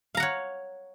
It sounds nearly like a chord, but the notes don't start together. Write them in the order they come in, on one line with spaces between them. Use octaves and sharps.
F5 A#5 F#5 C#5